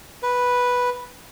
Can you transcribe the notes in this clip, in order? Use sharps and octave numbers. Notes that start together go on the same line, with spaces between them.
B4